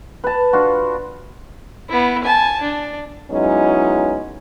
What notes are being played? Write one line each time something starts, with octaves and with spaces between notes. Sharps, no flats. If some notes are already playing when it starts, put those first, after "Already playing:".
B4 A5
D4 F4 F#4
B3 E4
G#5 A5
D4
F#3 G#3 B3 C#4 D#4 E4